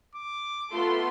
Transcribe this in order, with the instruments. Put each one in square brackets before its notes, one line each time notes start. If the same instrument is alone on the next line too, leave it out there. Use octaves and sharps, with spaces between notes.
[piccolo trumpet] D6
[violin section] A3 B3 [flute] F4 [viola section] A4 C6